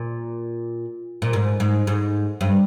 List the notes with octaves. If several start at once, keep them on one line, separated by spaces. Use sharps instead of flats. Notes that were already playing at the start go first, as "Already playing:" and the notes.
Already playing: A#2
A#2
G#2
G#2
G#2
G2